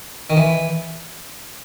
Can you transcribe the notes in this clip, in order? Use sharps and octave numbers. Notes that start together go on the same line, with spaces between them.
D#3
E3